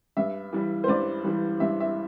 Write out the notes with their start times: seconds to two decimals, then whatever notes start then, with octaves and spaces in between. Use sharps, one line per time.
0.17 G2 E5
0.53 E3 G3
0.84 C5
0.88 G2 D5
1.24 E3 G3
1.60 G2 E5
1.80 E5